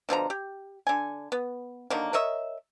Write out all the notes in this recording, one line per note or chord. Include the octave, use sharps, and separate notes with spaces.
B2 D3 F3 A#5
G4
D3 G#5
B3
D3 D#3 F#3 A#3
A#4 C#5 D#5 E5